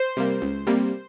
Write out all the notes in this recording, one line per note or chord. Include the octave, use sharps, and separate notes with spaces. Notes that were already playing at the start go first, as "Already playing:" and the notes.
Already playing: C5
C3 G3 A#3
C#2
C3 G3 A#3